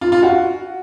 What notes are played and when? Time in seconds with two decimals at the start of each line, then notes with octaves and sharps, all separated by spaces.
0.01 F4
0.12 F4
0.23 F#4